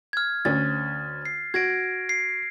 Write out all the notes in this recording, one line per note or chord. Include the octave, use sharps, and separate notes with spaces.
F6 G#6
D2 C#4 A6
C7
F#4 G#6 A#6 D7
C7